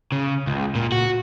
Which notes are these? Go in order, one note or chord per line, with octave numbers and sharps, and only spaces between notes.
C#3
C#2
A#2
F#4